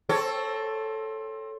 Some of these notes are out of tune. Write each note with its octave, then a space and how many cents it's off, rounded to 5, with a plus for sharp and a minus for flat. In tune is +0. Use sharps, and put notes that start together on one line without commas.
C4 +25 A4 +0 C#5 +0